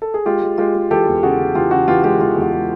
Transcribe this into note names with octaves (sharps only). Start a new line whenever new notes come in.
A4
G#4
G#3 F4 G4
G#3
G#3 F4 G4
G#3
E3 G4 A4
E2
C#3 F#4 G#4
C#3
E3 F4 G4
C#3 F#4
E3 F4 G4
G#3 F4 G4
E3 F4
E2
F#4
G#3